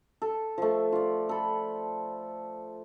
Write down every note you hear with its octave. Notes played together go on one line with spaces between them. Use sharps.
A4
F3 A3
F4 D5
A4 B5